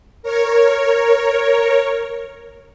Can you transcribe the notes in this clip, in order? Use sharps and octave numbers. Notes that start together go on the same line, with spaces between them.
A#4 C#5